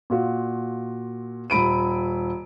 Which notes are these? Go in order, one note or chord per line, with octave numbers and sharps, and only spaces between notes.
A#2 F4 F#4
D#1 B5 D7 D#7